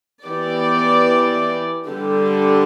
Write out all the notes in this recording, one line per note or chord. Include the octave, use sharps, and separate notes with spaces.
E3 B3 G4 D5
D3 G3 D4 G4